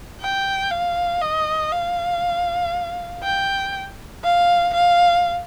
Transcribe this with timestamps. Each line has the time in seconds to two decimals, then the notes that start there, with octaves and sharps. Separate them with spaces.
0.21 G5
0.71 F5
1.21 D#5
1.72 F5
3.23 G5
4.24 F5
4.74 F5